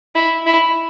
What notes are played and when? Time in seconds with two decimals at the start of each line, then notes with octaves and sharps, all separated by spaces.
0.15 E4
0.46 E4